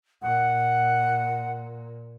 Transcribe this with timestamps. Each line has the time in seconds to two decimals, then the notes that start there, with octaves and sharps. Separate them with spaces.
0.22 A#2 F#5